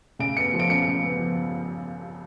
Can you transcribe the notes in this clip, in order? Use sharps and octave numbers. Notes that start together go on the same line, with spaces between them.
C#3 D7
B3 C#7
F3
D7
C#3 C#7
C#3
B3
F3